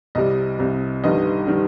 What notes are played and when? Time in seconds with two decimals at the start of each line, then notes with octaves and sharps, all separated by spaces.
0.15 C2 C3 G3 D#5
0.59 C2 C3 G3
1.04 G1 G2 D#3 G3 D#5
1.47 D#3 G3